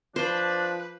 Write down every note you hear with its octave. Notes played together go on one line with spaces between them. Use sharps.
F3 D4 B4 C5